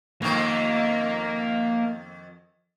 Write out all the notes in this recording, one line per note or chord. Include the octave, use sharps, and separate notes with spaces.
F2 D#3 A#3